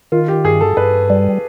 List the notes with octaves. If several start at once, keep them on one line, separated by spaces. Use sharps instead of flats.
D#3 F4
G4
G2 G#4
A4
G2 B4
G3